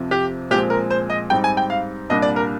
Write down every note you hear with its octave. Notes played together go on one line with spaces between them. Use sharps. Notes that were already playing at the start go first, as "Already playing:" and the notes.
Already playing: F2 C3 F3 C4
G4
A#2 F3 G#3 C4 G4
A#4
C5
D#5
G#2 G3 C4 D#4 G5
G#5
G5
F5
C2 A#2 G3 A#3 D4 D#5
D5
A#4